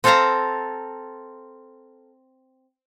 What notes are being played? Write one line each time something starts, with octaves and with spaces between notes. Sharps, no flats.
C4 A4 C5 F5 A5 A#5